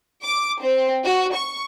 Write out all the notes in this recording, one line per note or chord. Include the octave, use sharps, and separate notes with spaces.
D6
C4
F#4
C#6